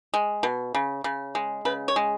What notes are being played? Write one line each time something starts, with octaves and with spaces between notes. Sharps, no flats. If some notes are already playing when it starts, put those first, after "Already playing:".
G#3
B2
C#3
C#3
G#3
C#3 B4
C#5
G#3